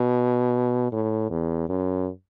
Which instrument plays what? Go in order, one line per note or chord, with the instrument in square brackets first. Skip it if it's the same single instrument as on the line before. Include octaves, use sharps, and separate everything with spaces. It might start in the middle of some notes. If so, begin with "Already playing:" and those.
Already playing: [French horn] B2
A2
E2
F#2